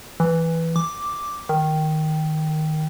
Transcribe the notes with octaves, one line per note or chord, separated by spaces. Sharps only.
E3
D6
D#3